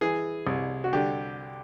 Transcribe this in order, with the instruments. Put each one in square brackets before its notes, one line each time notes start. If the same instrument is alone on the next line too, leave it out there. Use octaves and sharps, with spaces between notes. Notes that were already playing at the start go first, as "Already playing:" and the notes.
[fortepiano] E3 G#4
C2
F#4
D3 G4